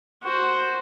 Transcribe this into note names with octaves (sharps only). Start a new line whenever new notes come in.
F#4 C5